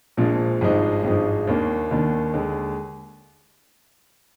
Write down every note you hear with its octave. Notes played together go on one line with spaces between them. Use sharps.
A#1 A#2 F3 G#3 D4
G#1 G2 F3 G#3 D#4
G#1 G2 F3 G#3 D#4
D#2 D#3 A#3 D4
D#2 D#3 A#3 D4
D#2 D3 G#3